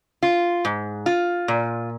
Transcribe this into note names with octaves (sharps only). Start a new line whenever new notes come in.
F4
G#2
F4
A#2